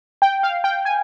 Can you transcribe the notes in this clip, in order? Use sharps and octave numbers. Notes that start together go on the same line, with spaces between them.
G5
F5
G5
G#5